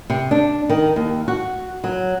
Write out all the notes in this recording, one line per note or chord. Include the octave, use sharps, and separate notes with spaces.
C3
D4
D#3
D#2
F#4
F#3